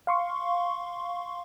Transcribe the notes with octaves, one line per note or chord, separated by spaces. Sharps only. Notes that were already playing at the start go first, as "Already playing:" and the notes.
F5 C6 C#6